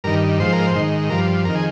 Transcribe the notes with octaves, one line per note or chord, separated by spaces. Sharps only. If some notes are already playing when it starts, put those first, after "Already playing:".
G2 D#3 A#4
G#2 F3 C5
A#4
C5
G#2 D#3
G2 F3 A#4
F2 D#3 A#4
G#4